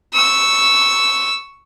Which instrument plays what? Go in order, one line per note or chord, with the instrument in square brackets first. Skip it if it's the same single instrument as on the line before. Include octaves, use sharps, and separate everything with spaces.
[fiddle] C#6 E6